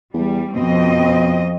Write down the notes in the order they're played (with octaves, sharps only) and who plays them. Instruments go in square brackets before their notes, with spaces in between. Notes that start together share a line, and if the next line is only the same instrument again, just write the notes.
[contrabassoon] E2 [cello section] G3
[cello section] F2 C4 D#5 [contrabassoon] B2